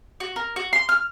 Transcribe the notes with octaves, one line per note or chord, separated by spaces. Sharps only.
F#4
A#4
F#4
C6
F6